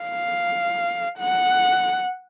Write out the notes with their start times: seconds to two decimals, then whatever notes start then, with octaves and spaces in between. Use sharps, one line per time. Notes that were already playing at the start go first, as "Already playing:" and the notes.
Already playing: F5
1.20 F#5